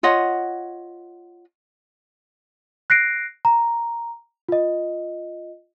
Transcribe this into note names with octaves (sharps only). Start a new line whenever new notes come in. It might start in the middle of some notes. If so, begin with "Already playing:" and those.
F4 C#5 D#5 F#5
F#6 A#6 C7 D7
A#5
F4 D#5